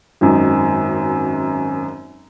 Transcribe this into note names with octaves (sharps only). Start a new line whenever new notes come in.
G#1 F#2 D#4